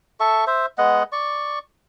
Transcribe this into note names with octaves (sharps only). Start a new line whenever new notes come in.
A4 E5 C#6
C5 E5
G#3 B3 D#5 F#5
D5 C#6